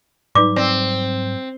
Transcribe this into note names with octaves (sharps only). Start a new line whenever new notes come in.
G#2 F#3 G3 D#4 B4 D5 D6
C4 D5